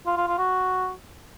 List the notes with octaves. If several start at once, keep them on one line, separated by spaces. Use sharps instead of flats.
F4
F4
F4
F#4